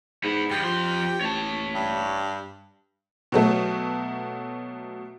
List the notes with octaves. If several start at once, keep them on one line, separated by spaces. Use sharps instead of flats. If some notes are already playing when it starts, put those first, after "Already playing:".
G#2 B3 E4
G2 F3 G4
F2 F3 C6
A1 C#5 A5
G2
B2 F#3 A3